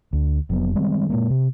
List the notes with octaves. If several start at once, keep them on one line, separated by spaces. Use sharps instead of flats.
D2
F1 F#3 B3
D#3 G3 G#3 C4
A#2 G#3 A#3
C3